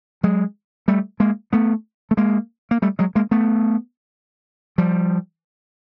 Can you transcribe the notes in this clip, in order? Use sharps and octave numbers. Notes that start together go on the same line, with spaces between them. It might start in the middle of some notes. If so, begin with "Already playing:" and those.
F#3 G#3
G3 A3
G#3 A#3
A3 B3
A3
G#3 A#3
A#3
G3 A3
F#3 G#3
G#3 A#3
A3 B3
F3 G3